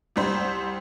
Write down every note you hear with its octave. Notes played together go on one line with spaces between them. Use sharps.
C2 G3 C5